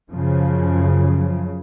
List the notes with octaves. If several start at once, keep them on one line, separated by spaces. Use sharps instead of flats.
F#2 C#3 F3